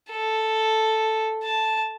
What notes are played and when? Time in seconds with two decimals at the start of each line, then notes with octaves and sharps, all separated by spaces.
0.11 A4
1.44 A5